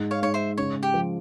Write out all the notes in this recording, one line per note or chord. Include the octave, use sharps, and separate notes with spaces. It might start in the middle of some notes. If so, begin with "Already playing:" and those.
Already playing: G#2
C#5 F5
G#2 C#5
C5 E5
C#3 C#5
G4
F3